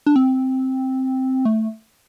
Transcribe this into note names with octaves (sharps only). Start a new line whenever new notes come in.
D4
C4
A3